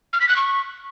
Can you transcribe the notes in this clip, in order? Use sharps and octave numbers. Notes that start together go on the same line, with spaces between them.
F6
B6
F#6
C#6